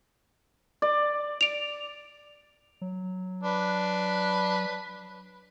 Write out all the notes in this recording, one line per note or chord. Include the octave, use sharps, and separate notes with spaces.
D5
D7 F7
F#3
D4 B4